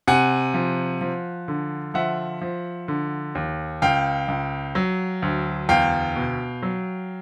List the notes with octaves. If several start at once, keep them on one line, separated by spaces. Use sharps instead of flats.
C3 F#5 G#5
F3
F3
D3
F3 E5 F#5
F3
D3
D#2
C#2 F5 G5
C#2
F#3
D2
E2 F5 G5
B2
F#3